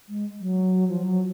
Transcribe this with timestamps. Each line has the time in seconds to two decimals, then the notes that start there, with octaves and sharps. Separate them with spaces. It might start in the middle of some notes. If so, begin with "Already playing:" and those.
0.09 G#3
0.40 F#3
0.88 F3
1.04 F#3